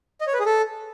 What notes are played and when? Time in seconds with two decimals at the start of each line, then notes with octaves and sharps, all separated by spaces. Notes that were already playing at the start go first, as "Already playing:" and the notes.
0.21 D#5
0.27 C#5
0.33 B4
0.40 G#4
0.46 A4